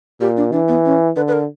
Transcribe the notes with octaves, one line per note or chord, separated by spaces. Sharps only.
A#2 G4
D4
E3 D4
B3
C#4
D3 B4
B4
A#4